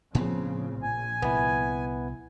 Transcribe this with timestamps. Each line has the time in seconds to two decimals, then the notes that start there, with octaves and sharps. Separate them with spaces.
0.15 A2 C#3 F3 B3 C4
0.82 A#1 G#5
1.22 C2 B3 E4